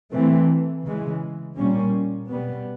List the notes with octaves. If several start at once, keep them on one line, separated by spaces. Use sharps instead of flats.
E3 A3 C4
C#3 E3 G#3
A#2 G3 A#3 C#4
B2 G3 B3